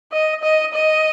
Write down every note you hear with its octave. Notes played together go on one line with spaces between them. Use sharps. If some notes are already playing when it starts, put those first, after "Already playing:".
D#5
D#5
D#5